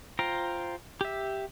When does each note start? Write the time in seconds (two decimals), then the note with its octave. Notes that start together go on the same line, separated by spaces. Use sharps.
0.19 F4 C5 G5 A#5
1.01 G4 E5